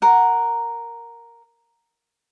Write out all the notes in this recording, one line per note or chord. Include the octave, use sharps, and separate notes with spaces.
A#4 F#5